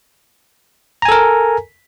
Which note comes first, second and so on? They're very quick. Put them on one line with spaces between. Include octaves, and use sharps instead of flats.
A#5 G#5 A4 A#4